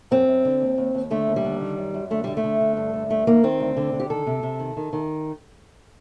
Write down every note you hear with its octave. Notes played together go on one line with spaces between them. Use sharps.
F#2 C4
F#2
D3
D#2
D#2
D#2
D3 A3
D#2
G3
D3
D#3
F#2
F#2
D3 A3
D3 G3
A3
D3
D3
G2
D3
G2 A3
D#3 A#3
D#3 C4
D2
D3
D3
G4
D#3 A4
C3
C3
D#3
D#3
D#3